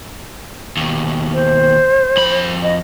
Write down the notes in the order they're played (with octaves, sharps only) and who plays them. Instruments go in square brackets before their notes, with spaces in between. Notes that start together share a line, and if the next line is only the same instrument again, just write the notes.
[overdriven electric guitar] D#2 B2
[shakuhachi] C5
[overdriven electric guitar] F2 B5
[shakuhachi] D#5